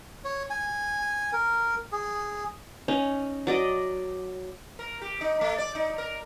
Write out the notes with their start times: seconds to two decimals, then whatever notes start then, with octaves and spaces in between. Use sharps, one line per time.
0.24 C#5
0.50 G#5
1.33 A#4
1.92 G#4
2.88 C#4 D#4
3.47 F#3 D5 D#5
4.79 A#4
5.02 G4
5.21 D#4
5.41 A3
5.58 D5
5.75 D#4
5.98 A#4